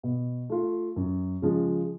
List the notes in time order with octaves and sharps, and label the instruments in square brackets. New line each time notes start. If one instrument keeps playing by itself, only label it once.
[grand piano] B2
A3 F4
F#2
C#3 F3 G#3